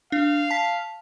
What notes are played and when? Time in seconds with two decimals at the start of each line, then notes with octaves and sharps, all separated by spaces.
0.12 D4 F5
0.51 A5 B6